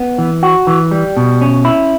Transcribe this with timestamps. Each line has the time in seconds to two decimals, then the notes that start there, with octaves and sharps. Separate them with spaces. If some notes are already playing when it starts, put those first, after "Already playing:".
Already playing: B3
0.18 E3
0.43 F#4
0.67 E3
0.91 G3
1.17 B2
1.41 C#4
1.65 E4